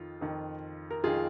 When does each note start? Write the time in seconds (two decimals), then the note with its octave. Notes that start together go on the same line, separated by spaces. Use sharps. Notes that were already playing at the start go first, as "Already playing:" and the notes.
Already playing: F2 D#3 F4
0.21 F2 D#3
0.91 A#4
1.04 F2 D#3 F4 G#4